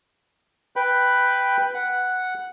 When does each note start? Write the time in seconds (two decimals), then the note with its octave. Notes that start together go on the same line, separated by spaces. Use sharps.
0.76 B4 G5 B5
1.74 F#5